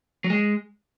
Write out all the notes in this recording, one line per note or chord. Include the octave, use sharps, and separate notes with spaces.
F#3
G#3